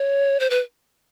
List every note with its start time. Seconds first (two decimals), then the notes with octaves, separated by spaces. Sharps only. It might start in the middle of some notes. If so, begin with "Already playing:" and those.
Already playing: C#5
0.40 C5
0.50 B4